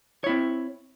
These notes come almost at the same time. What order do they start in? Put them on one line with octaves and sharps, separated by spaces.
C#5 E4 C4